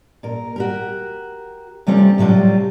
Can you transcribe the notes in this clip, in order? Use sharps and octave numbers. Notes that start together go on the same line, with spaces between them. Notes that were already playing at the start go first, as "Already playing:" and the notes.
A#2 A#4
F#4 G4 A#4
C3 G3 A3 C4 C#4 F4
A2 C3 F#3 G3 F4